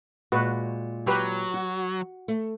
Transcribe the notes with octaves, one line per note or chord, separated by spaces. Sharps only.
A#2 G#3 F#4 B4
F#3 G4 B4
F#4
A3